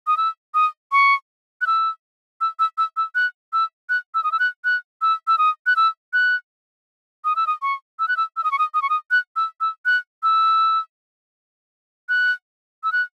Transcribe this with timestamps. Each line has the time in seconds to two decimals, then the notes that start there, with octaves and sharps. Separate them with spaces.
0.07 D#6
0.17 E6
0.54 D#6
0.92 C#6
1.61 F#6
1.67 E6
2.41 E6
2.59 E6
2.78 E6
2.97 E6
3.15 F#6
3.53 E6
3.89 F#6
4.14 E6
4.24 D#6
4.32 E6
4.39 F#6
4.65 F#6
5.02 E6
5.27 E6
5.38 D#6
5.66 F#6
5.76 E6
6.13 F#6
7.25 D#6
7.36 E6
7.47 D#6
7.62 C#6
7.99 E6
8.08 F#6
8.17 E6
8.37 E6
8.44 D#6
8.51 C#6
8.59 D#6
8.74 D#6
8.82 C#6
8.90 D#6
9.11 F#6
9.36 E6
9.61 E6
9.86 F#6
10.23 E6
12.09 F#6
12.84 E6
12.92 F#6